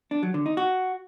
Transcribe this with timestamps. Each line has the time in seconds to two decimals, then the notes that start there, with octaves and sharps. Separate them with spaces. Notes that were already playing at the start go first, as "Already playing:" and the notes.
0.11 D4
0.23 F#3
0.34 D3
0.46 D#4
0.57 F#4